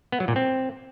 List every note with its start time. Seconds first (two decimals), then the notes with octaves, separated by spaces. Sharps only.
0.12 B3
0.20 F#3
0.28 A#2
0.36 C4